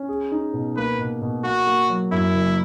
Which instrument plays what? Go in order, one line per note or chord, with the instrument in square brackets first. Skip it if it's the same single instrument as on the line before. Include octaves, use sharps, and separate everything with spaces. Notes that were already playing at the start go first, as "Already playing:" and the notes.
Already playing: [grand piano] C#4
G#4
D#4
B2
[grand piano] A#3 [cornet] B4
[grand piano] B2
B2
[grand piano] A#3 [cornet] F#4
[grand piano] A#3
F#3
[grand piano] F#2 [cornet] E4
[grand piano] F#1